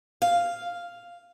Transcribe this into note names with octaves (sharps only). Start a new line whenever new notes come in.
F5